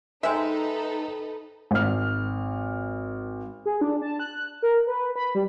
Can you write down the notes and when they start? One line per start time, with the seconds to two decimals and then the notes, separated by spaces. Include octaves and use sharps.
0.23 G#3 D#4 A4 B4 C5 E5 G5
1.71 G#1 F6
3.66 G#4
3.81 D4
4.02 A5
4.19 F#6
4.62 A#4
4.87 B4
5.16 B5
5.35 G3